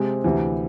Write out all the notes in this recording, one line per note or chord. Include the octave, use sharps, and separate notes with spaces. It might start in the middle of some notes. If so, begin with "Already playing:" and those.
Already playing: C3 G#3 C4
D2 C3 E3